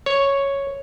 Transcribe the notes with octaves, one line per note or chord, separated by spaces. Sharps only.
C#5